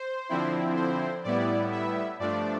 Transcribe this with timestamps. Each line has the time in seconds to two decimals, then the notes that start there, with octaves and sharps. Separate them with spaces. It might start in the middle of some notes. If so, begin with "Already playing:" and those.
Already playing: C5
0.29 D3 F3 C4 E4
0.76 C5
1.24 A2 G3 B3 E4 D5
1.72 E5
2.19 G2 F3 A3 D4 D5